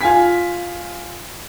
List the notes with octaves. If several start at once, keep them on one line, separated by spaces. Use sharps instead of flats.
F4 G#5 B6